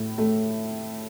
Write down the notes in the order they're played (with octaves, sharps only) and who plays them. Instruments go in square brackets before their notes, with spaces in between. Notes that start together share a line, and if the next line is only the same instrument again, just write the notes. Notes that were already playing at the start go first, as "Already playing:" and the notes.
Already playing: [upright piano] A2 E4
A3